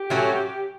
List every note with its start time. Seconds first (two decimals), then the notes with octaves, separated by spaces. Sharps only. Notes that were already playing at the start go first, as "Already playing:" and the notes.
Already playing: G4
0.10 A2 F#3 C#4 F#4